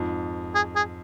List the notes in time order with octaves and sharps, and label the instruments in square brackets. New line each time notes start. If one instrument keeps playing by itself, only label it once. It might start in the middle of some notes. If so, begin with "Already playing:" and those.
Already playing: [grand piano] F2 G#2
[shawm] G#4
G#4